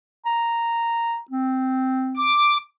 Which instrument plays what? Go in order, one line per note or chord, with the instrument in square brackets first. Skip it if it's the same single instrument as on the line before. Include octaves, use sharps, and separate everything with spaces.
[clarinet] A#5
C4
[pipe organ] D6